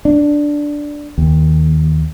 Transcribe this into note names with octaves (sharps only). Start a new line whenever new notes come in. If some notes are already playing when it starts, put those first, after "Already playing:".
D4
D#2